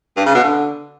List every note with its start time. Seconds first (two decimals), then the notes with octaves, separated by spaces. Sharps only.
0.17 G2
0.26 C#3
0.35 B2
0.44 D3